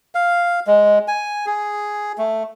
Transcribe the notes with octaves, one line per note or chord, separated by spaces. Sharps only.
F5
G#3
G#5
G#4
A3